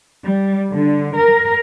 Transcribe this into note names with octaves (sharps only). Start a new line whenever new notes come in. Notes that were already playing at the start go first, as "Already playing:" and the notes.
G3
D3
A#4